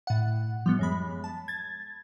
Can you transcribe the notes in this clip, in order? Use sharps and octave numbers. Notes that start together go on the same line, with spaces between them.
A2 F#5
F3 G3 B3
F#2 G#3 B5
A5
G#6 A6